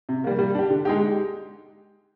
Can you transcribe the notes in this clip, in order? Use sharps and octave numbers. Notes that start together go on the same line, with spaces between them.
C3
G3 A#3
G3
D4 G4
D3
G#3 D#4 G4